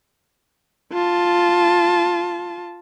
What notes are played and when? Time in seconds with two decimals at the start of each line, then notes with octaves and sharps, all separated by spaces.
0.93 F4 A5